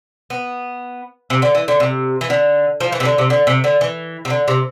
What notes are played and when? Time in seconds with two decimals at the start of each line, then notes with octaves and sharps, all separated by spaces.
0.30 B3
1.30 C3
1.42 D3
1.55 E3
1.68 D3
1.80 C3
2.21 E3
2.30 D3
2.80 F3
2.92 E3
3.00 C3
3.05 D3
3.18 C3
3.30 D3
3.47 C3
3.64 D3
3.81 E3
4.25 C3
4.30 D3
4.48 C3